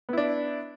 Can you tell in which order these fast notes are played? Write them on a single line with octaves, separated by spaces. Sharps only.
B3 E4 D4